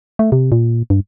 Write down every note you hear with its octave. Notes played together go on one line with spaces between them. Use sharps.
A3
C3
A#2
G2